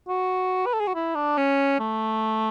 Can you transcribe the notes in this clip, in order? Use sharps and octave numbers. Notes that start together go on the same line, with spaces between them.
F#4
B4
A4
G#4
F#4
E4
D4
C#4
A3